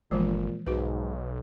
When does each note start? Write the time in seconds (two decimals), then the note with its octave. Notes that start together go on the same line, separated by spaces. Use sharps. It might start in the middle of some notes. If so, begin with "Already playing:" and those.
0.11 G1 A#2 E3 F3 G#3
0.67 B1 G#2 F#4 B4